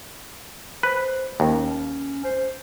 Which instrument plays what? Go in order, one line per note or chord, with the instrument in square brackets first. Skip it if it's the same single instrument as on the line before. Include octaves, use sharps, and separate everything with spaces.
[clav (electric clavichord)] B4 [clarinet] C5
[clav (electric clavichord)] D#2 [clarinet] C#4
[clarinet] C5